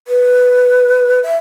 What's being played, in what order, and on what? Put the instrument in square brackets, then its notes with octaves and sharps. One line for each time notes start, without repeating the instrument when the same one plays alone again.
[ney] B4
E5